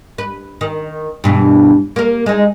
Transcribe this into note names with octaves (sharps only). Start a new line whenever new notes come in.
B4
D#3
G2 B2 E3
A#3 A#4
G#3 D#4